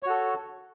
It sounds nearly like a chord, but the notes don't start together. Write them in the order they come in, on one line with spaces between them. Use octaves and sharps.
C#5 F#4 A4